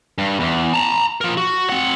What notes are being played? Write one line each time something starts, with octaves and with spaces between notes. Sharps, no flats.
G2
E2
A5 A#5
F3 A#4
F#4
C4 F#5